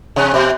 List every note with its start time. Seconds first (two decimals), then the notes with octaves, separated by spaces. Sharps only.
0.16 C3
0.34 B2